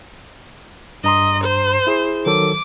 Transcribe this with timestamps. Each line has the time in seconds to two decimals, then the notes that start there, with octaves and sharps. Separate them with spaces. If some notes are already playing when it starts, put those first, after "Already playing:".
1.04 G2 D#5 A#5 C6
1.44 C5
1.87 E4 G#4
2.26 D#3 F#3 A4 D6